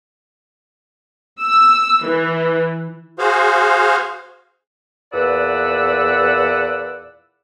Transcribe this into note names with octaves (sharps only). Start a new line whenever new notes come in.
E6
E3
F#4 G#4 C5 F5
E2 A#2 B4 D5 F#5 E6